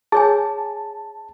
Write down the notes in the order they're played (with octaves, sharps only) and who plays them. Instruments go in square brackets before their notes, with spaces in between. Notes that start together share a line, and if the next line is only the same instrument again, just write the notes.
[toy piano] G#4 C#5 G#5 [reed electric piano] A5